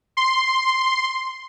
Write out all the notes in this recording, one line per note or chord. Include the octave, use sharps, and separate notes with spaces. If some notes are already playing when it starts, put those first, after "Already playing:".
C6